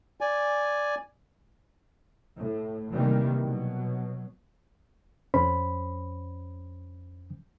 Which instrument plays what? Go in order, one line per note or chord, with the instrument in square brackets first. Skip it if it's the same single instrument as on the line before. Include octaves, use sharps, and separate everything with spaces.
[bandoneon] D5 G#5
[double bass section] A2
C3 D#3 E3 G3 A#3
B2 F#3
[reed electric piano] F2 C#4 C5 B5